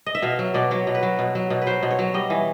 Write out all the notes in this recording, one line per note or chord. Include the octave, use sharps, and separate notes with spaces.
D#5
E5
B2 F5
F#3
B2 D5
F#3 C#5
B2
B4
F#3
B2
F#3
B2
B4
F#3 C5
B2
C#5
F#3
G3 D#5
E3